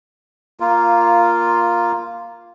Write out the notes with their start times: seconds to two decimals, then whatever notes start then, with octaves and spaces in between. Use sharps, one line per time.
0.60 A#3 F4